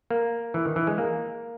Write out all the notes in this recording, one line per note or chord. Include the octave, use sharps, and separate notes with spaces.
A#3
E3
D#3
E3
G#3
A#3